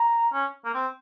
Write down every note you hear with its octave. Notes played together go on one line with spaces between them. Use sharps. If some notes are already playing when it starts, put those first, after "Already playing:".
Already playing: A#5
C#4
A#3
C4